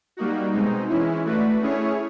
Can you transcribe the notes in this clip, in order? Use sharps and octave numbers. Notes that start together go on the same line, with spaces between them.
G3 A#3 D#4 F#4
B2 G#3 C4 D#4
E3 G#3 C#4 E4
A3 D4 F#4 B4
A3 C#4 E4 G#4 C#5